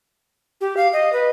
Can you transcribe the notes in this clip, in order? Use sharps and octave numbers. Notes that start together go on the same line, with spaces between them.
G4
F5
D#5
B4